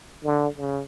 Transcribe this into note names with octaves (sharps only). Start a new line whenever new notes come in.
D3
C#3